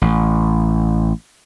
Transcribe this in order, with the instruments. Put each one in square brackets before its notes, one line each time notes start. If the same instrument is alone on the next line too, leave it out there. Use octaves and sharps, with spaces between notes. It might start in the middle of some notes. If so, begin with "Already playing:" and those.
[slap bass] A1